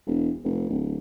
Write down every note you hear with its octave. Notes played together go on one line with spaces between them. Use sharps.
E1
F1
D1